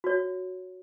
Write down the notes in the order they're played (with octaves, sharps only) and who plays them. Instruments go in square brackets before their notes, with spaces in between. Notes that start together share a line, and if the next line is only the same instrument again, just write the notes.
[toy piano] F#4 C#5